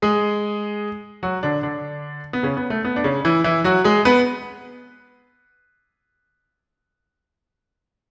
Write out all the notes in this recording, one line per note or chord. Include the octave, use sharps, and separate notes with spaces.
G#3 G#4
F#3 F#4
D3 D4
D3 D4
B3
C#3 C#4
B3
A3
B3
D4
C#3 C#4
E3 E4
E3 E4
F#3 F#4
G#3 G#4
B3 B4